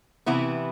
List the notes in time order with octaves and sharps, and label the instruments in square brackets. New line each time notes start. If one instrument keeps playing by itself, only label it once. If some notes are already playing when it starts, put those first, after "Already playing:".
[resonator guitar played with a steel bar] C3 E3 B3 E4